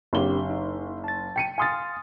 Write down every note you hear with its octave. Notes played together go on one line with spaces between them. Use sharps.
F#1 C4 D4 G4 G7
D#4
A5 A6
G5 C#7 D#7
F5 G#5 C6 D#6 F6 A6